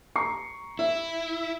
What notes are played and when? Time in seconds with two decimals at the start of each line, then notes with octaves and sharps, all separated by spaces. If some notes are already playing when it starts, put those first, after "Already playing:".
0.16 A#5 C#6 C7
0.79 E4 E5